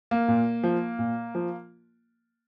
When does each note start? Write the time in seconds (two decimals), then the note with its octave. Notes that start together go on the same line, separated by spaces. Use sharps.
0.11 A#3
0.28 A#2
0.63 F3
0.99 A#2
1.35 F3